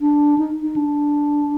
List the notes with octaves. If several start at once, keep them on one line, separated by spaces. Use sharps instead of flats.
D4
D#4
D#4
D4